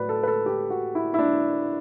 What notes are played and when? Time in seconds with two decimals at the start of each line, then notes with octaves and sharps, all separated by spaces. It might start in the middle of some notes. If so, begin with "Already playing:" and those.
Already playing: A2 F#3 B4 D5
0.09 A4
0.23 B4
0.28 A4
0.46 G4
0.70 F#4
0.95 E4
1.14 E4
1.19 D4